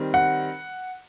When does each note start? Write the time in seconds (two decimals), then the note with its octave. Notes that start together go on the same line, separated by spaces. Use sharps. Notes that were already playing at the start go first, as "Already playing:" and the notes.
Already playing: D#3 G3 C4
0.14 F#5